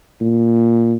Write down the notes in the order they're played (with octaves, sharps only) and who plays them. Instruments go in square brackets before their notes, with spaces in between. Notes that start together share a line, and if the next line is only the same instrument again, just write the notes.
[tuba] A#2